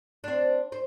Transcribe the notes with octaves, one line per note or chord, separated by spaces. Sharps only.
C4 D4
C5